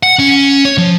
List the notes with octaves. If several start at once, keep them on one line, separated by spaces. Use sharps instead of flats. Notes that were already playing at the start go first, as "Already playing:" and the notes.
F#5
C#4
C#5
F3